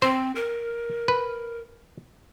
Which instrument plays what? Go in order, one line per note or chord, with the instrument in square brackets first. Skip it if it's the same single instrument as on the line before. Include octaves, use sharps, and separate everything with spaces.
[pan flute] C4 [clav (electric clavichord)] C5
[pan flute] A#4
[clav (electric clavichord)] B4